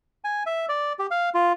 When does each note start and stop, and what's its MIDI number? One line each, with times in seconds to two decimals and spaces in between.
0.24 0.43 80
0.46 0.65 76
0.69 0.93 74
0.99 1.07 67
1.11 1.29 77
1.35 1.53 65